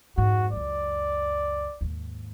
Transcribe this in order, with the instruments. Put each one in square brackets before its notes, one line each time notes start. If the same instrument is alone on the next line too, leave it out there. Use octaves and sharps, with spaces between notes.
[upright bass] F2 G#2 [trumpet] F#4
[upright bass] C#2 F#2 [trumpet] D5
[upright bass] D#2 G#2